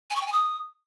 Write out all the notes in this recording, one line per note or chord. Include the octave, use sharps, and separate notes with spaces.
G#5
C#6
G5
G#5
D#6